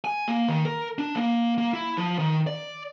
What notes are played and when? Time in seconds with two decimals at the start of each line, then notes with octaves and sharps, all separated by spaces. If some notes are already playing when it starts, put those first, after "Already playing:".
0.05 G#5
0.28 A#3
0.48 D#3
0.65 A#4
0.98 D4
1.16 A#3
1.58 A#3
1.73 E4
1.97 F3
2.19 D#3
2.47 D5